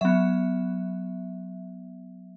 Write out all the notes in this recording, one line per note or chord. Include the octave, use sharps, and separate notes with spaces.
F#3 B3 E5